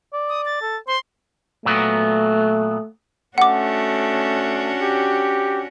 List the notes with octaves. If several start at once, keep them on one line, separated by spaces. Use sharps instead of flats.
D5
D#6
A6
A4
C5 C6
A#2 F#3 A3 B3
A3 C#4 D4 F#4 F#5 D6
G4